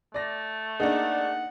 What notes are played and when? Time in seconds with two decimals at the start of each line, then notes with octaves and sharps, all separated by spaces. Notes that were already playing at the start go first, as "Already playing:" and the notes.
0.14 A3 D5 A#6
0.80 A#3 D4 D#4 G#4 F#5